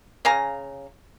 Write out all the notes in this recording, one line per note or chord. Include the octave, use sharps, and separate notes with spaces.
C#3 F5 G#5 A#5